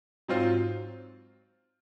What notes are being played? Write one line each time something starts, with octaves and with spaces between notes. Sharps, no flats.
G#2 F#3 C4 F4 C5